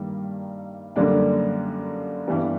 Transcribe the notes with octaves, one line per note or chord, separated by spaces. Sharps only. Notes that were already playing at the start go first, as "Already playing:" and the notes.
Already playing: G2 D#3 G3 A#3
F#2 D3 G3 A#3 D4
G2 E3 G3 B3